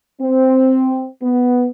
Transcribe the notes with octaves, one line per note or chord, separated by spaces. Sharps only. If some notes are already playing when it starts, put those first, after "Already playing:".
C4
B3